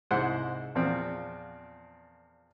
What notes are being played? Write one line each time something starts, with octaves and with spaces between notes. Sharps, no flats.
C2 G#2 G#3 E4 C5 F#5
E2 A#2 F3 C4